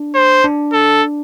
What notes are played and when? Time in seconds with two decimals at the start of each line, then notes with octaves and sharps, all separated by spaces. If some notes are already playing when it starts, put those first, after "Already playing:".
Already playing: D4
0.15 C5
0.44 D4
0.73 A4